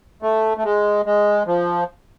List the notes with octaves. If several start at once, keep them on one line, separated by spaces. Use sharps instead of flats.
A3
A3
G#3
G#3
F3